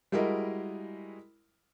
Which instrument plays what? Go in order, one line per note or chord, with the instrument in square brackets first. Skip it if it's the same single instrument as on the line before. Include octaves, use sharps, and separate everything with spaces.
[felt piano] G3 G#3 E4 F#4 A#4 D#5